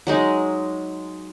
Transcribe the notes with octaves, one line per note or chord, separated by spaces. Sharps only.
F#3 G#3 D#4